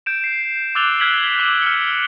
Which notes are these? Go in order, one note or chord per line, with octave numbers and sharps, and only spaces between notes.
G6 D7 E7
C7
D6 E6 F#6 A6 F7 G7
F6 F#6 G#6 B6 D7 F#7
D6 F#7
F6 C#7